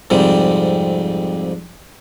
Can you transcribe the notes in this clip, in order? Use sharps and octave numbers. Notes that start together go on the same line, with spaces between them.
F2 G#2 C3 G3